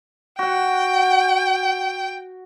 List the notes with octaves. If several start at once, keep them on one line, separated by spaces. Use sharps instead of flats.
F#4 F#5 G5